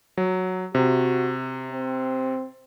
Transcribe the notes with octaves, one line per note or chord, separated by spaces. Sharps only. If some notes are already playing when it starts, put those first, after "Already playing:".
F#3
C3 F#4
C4